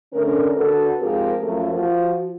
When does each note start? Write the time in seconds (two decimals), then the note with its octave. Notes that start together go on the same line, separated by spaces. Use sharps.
0.13 D3 A3 C#4 D4 A#4
0.55 D3 F#4 A4 B4
1.00 G#2 F3 C4 G4 G#4 A#4
1.42 F#2 F3 A3 A#4
1.72 F3 F#4